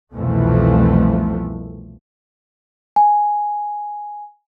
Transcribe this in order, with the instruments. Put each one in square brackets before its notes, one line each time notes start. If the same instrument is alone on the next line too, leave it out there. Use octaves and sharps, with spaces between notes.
[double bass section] C2 F2 B2 E3 F3 A3
[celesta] G#5